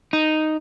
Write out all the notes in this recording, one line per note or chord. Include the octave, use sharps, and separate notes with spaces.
D#4